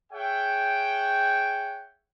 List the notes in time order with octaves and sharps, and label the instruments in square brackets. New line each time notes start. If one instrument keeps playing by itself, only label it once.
[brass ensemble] G#4 C#5 E5 F#5 G5